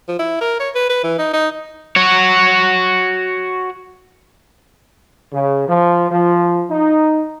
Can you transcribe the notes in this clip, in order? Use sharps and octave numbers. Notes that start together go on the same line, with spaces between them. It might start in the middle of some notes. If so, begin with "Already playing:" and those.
F3
E4
A#4
C#5
B4
B4
E3
D#4
D#4
F#4 C#5
C#3
F3
F3
D#4